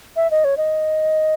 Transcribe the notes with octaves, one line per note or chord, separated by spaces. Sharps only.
E5
D#5
C#5
D#5